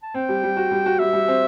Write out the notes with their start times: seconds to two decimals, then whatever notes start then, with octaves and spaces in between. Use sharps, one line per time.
0.02 A5
0.14 C4 G5
0.29 G3
0.43 G3
0.57 F#4
0.71 G3
0.86 F#4
0.99 G3 E5
1.13 G3
1.28 C4